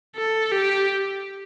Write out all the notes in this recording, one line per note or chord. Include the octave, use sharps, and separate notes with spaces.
A4
G4